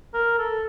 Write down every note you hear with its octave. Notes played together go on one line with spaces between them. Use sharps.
A#4
A4